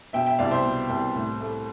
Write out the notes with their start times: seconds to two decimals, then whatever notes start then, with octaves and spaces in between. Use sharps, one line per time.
0.13 B2 E5 G5
0.26 E5 G5
0.39 C2 D5 F5
0.51 C5 E5
0.65 B2
0.90 C2
1.15 A2
1.41 A3